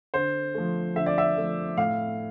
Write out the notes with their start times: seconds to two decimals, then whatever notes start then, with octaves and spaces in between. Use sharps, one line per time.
0.14 D3 C5
0.54 F3 A3
0.96 D3 E5
1.06 D5
1.18 E5
1.36 F3 A3
1.77 A2 F5